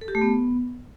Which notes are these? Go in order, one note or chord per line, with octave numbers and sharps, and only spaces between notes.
A4
G4
A3
B3